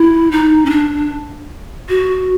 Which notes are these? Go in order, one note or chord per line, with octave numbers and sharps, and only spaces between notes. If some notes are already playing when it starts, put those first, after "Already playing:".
Already playing: E4
D#4
C#4
D4
F#4